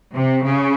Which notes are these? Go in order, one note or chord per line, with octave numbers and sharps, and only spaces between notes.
C3
C#3